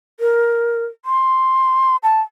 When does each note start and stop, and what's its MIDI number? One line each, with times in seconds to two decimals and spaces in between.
0.20 0.85 70
1.05 1.96 84
2.03 2.21 81